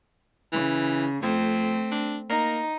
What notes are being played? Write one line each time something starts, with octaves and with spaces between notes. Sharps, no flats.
C#3 E3
F2 A3 C4
D4
A#3 D#4